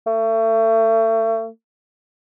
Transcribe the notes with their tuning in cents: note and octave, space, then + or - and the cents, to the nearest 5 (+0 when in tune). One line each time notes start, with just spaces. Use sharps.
A3 +35